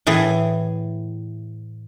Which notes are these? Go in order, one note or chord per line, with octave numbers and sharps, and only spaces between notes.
A2 E3 G#4